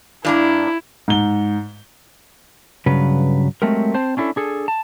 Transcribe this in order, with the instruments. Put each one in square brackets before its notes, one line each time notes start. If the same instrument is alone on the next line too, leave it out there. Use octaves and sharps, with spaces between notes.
[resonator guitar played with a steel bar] G2 D4 A#5 [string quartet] E4
[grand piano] G#2 G7
[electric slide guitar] G2 C#3 F#3 B4
F#3 G#3 A3 C4 G4 A#4
C4 C5 A5
C#4 D4 E4 F#4 A4
D4 G#4 A4
A5